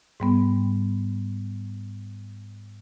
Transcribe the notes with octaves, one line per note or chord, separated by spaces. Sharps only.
G#2 G3 B3